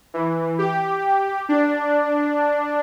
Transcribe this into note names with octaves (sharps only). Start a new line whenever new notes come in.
E3
G4
D4